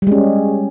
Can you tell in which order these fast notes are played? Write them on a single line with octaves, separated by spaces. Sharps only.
G3 G#3 C#4